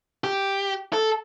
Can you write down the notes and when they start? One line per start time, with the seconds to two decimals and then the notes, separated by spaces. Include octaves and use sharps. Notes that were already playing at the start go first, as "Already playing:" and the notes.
0.24 G4
0.93 A4